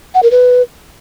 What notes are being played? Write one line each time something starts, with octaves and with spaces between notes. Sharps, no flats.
F#5
A#4
B4